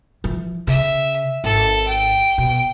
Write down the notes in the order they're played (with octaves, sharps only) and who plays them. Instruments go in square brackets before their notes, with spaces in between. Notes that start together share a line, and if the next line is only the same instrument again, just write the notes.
[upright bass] E3 F3
[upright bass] C#3 [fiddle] E5
[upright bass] G#1 [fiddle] A4
[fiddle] G5
[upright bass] B2